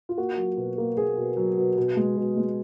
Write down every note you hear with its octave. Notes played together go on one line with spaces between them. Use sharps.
F4
A#3 F#4
F#3
B2
A#3
A#3 G#4
B2
F#3
B2
B2
G#3
B2
G#3